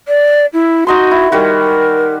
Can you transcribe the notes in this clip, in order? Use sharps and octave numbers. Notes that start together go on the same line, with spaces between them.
D5
E4
D#4 F#4 D#5 C6
E4
D#3 G3 F#4 A#4